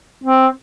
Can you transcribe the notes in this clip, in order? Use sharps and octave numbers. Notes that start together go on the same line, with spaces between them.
C4